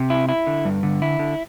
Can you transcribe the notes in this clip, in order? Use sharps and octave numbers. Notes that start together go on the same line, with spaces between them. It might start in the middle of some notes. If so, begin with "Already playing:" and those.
Already playing: C3
E4
E4
D3
G2
D3
E4
D3